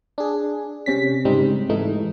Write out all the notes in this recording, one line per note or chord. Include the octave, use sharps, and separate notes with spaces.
D4 G#4
C3 C#4 B6
G#2 C#3 G3 C4 D#4
G#2 E3 A3 D#4